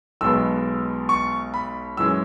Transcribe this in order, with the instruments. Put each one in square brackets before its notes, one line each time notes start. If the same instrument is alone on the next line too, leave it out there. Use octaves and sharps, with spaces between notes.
[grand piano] B1 B2 G#3 B3 E6
C#6
B5
F#2 E3 G#3 C#4 E6